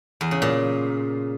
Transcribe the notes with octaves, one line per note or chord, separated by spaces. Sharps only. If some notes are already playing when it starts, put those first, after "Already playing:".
E2
C#3
A#2